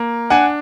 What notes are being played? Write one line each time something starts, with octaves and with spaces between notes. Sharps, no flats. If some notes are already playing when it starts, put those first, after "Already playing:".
Already playing: A#3
D4 F#5 G#5